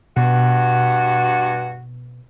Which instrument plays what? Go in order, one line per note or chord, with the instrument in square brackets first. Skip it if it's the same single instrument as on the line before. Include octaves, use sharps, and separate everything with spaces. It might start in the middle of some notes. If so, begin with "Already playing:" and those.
[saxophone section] G2 F#4 [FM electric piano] B2